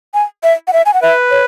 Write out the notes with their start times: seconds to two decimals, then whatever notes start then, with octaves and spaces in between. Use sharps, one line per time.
0.14 G#5
0.43 E5
0.68 F#5
0.73 E5
0.86 G#5
0.94 F#5
1.02 B4 E5
1.31 C#5